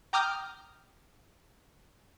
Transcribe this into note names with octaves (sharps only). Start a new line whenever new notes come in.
G5 A#5 D6 D#6 F6 G6